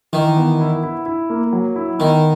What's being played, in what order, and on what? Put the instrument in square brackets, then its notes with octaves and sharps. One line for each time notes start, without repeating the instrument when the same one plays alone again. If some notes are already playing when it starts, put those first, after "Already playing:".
[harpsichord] D#3 [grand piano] E3
[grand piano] B3
E4
E4
E4
A#3
F#3
E4
[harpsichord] D#3 [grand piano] B3